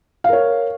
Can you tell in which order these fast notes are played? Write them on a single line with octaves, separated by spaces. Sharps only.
F5 A#4 C#5